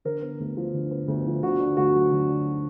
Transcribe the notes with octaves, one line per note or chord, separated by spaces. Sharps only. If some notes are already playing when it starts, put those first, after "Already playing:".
D3 A#4
B3
D2
F3
D3
B3
D2
F3
D3 F#4
D4
D2 F#4
F#3
D3
D4